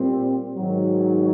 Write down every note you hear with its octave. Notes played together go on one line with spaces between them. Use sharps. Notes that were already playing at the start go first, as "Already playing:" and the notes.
Already playing: A#2 G3 C4
G#2 D#3 F#3